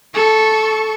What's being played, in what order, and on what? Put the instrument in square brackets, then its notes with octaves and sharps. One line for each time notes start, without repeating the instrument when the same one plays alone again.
[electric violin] A4 C#6